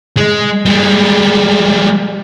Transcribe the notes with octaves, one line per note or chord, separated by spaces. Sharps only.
G#3
G3 G#3